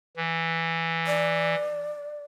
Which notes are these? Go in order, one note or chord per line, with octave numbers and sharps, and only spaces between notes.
E3
D5